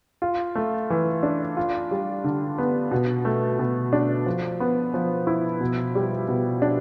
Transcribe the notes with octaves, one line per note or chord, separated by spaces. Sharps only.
F4
A3
E3
D4
F4
G3
D3
B3
B2
A3
B2
D4
F3
B3
F3
E4
B2
G3
B2
D4